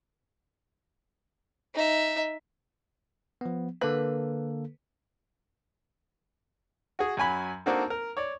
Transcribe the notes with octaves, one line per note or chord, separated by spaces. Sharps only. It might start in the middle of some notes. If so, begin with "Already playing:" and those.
D#4 E5
F3 B3
D3 A#3 A4 B4
F#4 G#4
F#2 F#3 G#5 B5
A#3 C4 D4 D#4 F#4 A4
A#4
C#5 D5